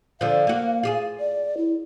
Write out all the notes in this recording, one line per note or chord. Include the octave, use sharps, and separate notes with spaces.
D3 F3 F5
A#3 F#4
F4 G4 G#4
D5
E4